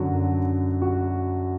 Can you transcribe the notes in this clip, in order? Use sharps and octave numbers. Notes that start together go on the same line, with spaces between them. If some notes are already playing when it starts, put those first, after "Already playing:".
Already playing: F#2 D3 F#3 F#4
F#4